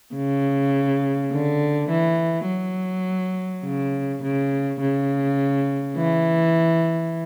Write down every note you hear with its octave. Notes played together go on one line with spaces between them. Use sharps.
C#3
D3
E3
F#3
C#3
C#3
C#3
E3